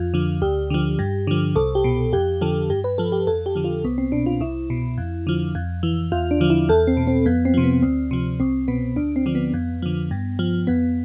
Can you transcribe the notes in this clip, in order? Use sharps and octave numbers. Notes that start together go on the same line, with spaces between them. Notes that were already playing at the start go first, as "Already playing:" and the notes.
Already playing: F2 F4
D3 F3
D2 G4
D3 F3
G2
D3 F3
C2 A4
G4
B2
F2 G4
D3 F3 A4
G2 G4
B4
F3 A4
G4
F2 A4
G4
D3 F3
F4
C2 B3
C4
B2 D4
F4
C2 E4
B2
F2
D3 F3
F2
E3
E2 F4
D4
D3 F3
E4
E2 A4
C4
B2
C4
F2 B3
C4
C3 F3
B3
D2 C4
C3 F3
C2 C4
B2 B3
D2 D4
C4
D3 F3
B3
F2
D3 F3
G2
F3
F2 B3